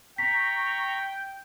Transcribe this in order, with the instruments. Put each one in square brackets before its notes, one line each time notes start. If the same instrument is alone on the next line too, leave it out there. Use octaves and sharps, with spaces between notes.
[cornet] G5 [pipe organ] A#5 C#6 [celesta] B6